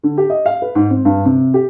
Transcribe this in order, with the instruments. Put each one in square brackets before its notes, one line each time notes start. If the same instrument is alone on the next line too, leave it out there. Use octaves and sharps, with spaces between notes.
[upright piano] D3
G4
D#5
F5
B4
G#2
C4
G2
C3
G4